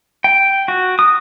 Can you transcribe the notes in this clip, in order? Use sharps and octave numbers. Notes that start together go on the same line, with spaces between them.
G5
F#4
D#6